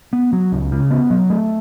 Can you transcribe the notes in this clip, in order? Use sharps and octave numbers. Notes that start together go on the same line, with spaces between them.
B3
F#3
C#2
C#3
B3
F#3
A3